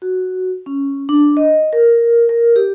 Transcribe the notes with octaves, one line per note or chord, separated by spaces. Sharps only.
F#4
C#4
D4
D#5
A#4
A#4
G4